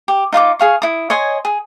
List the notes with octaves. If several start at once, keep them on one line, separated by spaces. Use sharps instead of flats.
G4
D#4 F4 F#5 D6
G#4 F5 C#6
E4 D#6
C#5 D#5 G#5 C6
G#4